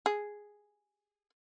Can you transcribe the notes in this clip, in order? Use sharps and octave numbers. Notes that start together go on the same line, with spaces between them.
G#4